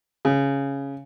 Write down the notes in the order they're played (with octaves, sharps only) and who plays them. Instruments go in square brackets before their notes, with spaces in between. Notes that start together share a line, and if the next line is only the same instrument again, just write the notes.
[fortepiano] C#3